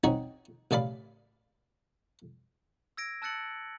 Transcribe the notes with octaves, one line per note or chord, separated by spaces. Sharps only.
C4 C#4 D#4 F#4 G#4
A1 C#3 D5 F5 B5
E6 G#6 A#6 D7
A5 E6 F#6 A6 C#7 F#7